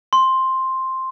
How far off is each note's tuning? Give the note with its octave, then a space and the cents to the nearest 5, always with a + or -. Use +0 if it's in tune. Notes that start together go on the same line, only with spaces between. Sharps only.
C6 +5